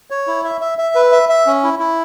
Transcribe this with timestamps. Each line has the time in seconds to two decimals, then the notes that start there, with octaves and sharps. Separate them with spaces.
0.10 C#5
0.27 E4
0.44 E5
0.61 E5
0.78 E5
0.95 B4
1.12 E5
1.29 E5
1.46 C#4
1.64 E4
1.79 E4